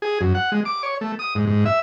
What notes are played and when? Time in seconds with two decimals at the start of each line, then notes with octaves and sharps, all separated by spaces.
0.02 G#4
0.21 F#2
0.35 F#5
0.52 G#3
0.65 D6
0.83 C#5
1.01 A3
1.19 D#6
1.35 G#2
1.47 G#2
1.65 E5